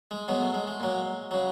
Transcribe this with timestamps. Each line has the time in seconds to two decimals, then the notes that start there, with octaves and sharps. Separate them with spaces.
0.11 G#3
0.28 B2 F#3 G#3
0.41 A3
0.54 G#3
0.67 G#3
0.80 A#2 F#3
1.31 C#3 F#3